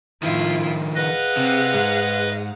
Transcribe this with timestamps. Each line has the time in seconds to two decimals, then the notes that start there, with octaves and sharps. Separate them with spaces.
0.23 A2 D#3 F3 E4 F4
0.95 G#4 B4 D#5 F5 F#5
1.37 C3
1.74 G#2